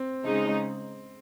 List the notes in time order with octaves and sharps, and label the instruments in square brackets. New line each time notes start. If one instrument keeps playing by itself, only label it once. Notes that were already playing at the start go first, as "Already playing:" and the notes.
Already playing: [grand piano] C4
[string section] C#3 G#3 D#4